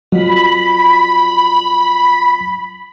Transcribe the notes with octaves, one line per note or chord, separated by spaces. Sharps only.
F2 F#3 B5